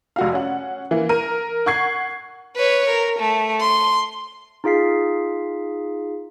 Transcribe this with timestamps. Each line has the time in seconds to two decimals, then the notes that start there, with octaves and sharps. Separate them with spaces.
0.16 F1 F#4 F5
0.33 C#4 F#5
0.91 E3 A#3
1.09 A#4 D#7
1.66 F#5 C#6 G#6 C7
2.56 B4 C#5
2.88 A#4
3.19 A3
3.60 C6
4.64 D#4 F4 G#4 F5 B6 C7